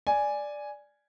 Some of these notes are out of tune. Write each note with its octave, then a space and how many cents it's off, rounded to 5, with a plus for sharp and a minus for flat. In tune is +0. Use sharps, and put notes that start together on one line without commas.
D5 +0 G#5 +0